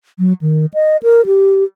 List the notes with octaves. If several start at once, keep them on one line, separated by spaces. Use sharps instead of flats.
F#3
D#3
D#5
A#4
G4